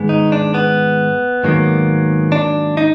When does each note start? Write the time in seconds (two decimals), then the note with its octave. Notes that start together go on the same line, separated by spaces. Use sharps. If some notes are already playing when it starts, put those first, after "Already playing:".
Already playing: G#2 D#3 G#3 B3
0.09 D#4
0.32 D4
0.54 B3
1.44 G#2 D#3 F#3 A#3
2.32 D4
2.77 D#4